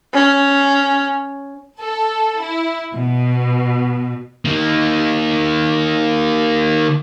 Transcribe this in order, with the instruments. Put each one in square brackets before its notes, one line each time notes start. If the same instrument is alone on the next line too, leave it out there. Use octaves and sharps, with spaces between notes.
[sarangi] C#4
[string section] A4
E4
B2
[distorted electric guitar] D#3 A#3